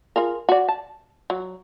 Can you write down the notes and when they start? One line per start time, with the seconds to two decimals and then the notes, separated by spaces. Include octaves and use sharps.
0.16 F4 G#4 A#4
0.49 F#4 D5
0.68 A5
1.30 F#3